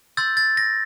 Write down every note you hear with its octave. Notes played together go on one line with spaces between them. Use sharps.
C6 E6 G6 A6
A6
A#6